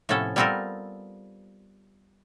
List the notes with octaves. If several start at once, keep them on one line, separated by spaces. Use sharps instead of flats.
A2 C3 F3 B3 C#4 A4
G3 B3 C4 F4 A4 A#4